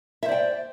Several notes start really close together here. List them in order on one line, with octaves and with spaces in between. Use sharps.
E5 C5 D5 G5